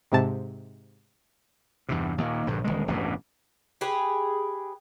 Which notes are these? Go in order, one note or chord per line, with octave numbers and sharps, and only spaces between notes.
G#2 C3 A5
E2 G2 C3
D#2 A#2
A#1 G2 D3
D#1 C2 D3 G#3
E1 A1 G2 B2
G4 G#4 B4